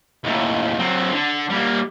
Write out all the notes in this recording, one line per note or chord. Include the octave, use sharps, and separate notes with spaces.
D#2 A2
F#3 C4
D3
G3 A#3